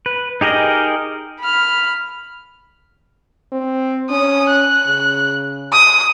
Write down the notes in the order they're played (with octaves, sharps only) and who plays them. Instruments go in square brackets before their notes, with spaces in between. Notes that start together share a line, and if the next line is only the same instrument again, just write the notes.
[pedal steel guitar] B4
D#4 G4 G#4 A#4 D#5
[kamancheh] B5 F6
[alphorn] C4
[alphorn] C#4 [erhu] D#6
[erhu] F#6
[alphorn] C#3
[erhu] D#6